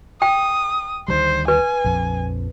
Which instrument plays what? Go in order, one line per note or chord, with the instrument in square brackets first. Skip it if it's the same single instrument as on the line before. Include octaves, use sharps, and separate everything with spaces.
[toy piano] G5 [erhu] D#6
[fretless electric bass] D2 D#3 G3 [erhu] C5
[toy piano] B4 [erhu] G#5
[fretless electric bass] A#1 F2